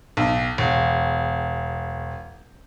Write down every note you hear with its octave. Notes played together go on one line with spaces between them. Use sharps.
B1
E1